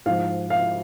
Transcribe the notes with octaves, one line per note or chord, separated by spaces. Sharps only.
G#2 F3 F5
F5